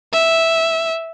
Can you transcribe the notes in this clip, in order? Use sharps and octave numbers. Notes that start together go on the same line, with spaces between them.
E5